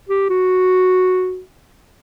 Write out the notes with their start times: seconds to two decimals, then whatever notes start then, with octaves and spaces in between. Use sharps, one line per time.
0.09 G4
0.30 F#4